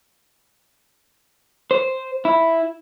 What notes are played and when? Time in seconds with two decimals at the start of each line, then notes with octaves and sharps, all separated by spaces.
1.71 C5
2.25 E4